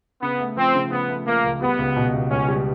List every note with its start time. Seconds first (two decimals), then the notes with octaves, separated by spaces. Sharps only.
0.22 C#3 B3
0.40 A3
0.57 F3 C4
0.75 C#3
0.91 C#3 B3
1.09 A3
1.26 F3 A#3
1.44 C#2
1.61 G3 B3
1.79 C#2
1.96 B2
2.13 C#2
2.31 C#2 C#4
2.48 G3